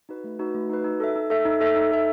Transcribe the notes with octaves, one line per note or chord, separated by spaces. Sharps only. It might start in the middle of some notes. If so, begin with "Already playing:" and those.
D#4 F#4 B4
A3
D#4 F#4 B4
A3
D#4 F#4 B4
D#4
A4 E5
D#4
A4 E5
D#4
A4 E5
D#4
A4 E5